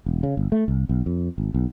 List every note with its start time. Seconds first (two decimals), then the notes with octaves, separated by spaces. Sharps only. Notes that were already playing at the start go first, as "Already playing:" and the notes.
0.06 E1
0.23 C#3
0.37 G1
0.52 A3
0.68 C2
0.89 B1
1.06 F2
1.38 G#1
1.54 B1